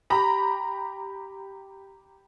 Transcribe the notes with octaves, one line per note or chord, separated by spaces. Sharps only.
G4 A#5 B5